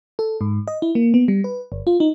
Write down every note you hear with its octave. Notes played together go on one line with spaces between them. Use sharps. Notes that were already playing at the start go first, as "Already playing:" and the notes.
A4
G#2
D#5
E4
A#3
B3
G3
B4
G1
F4
D#4